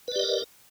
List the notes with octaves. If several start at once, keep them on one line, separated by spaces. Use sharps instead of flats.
G4 A#4 B4 D5 D#5